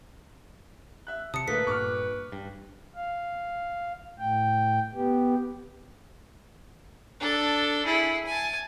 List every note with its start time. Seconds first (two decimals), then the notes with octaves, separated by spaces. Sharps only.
1.07 E5 F#6
1.34 C3 A5 D#6 C#7
1.48 A2 D3 A3 A#3 A4 B4 B6
1.67 G2 A#2 C#6 D6 F6
2.32 G2
2.95 F5
4.18 A2 G5
4.94 B3 G4
7.20 D4 A4
7.85 E4 G#4
8.26 G#5 A5